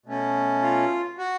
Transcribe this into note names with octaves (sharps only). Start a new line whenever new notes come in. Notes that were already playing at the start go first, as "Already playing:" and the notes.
B2 A3 C#4
F4
F#4